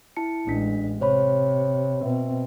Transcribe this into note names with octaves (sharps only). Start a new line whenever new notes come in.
E4 A5 C#7
A1 G#3 A3 D4 B6
C3 C5 C#5 B5
B2 C4 E5